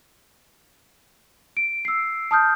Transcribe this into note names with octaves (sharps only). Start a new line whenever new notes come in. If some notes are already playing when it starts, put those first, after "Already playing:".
D7
E6 C7
A5 D#6 F6 G6